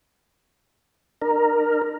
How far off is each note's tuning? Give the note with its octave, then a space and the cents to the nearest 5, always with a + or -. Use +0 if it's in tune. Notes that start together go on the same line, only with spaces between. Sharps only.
D4 +45 A#4 +0